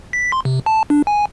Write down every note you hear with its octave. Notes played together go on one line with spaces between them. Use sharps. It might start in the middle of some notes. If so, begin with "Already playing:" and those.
B6
C6
C3
A5
D4
G#5